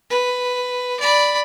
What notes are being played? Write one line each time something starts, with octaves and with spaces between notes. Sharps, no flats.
B4
D5 B5